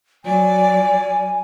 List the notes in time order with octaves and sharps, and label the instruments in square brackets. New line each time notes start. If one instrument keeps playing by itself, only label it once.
[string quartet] F#3 D5 [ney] G#5